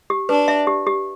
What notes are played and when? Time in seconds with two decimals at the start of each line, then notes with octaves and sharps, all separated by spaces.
0.10 G4
0.29 D4 B4
0.48 E5
0.67 G4
0.87 G4